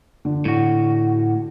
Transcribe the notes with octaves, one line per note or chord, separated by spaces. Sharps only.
D3
A2 F#4